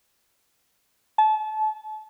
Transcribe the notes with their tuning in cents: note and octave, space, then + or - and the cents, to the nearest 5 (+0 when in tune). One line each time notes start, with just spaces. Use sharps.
A5 -30